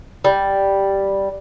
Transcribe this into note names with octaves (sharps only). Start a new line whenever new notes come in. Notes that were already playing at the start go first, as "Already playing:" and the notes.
G3